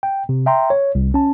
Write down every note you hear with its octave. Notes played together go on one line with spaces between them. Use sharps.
G5
C3
E5 G5 A#5 C6
C#5
C2
C#4 A5